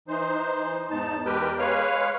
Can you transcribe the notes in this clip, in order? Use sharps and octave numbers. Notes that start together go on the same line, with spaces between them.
E3 D#4 C5
E2 G#2 D#4 A5
E2 G#3 G4 A#4 B4 G5
G#3 B4 C#5 F5 F6